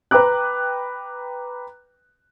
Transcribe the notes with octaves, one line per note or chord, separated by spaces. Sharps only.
B4 G5 A#5 D6 F#6